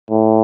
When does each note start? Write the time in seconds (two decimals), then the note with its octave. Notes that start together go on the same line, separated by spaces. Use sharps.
0.11 A2